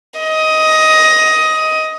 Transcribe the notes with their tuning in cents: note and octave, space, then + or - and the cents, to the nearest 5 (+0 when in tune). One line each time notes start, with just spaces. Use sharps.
D#5 +15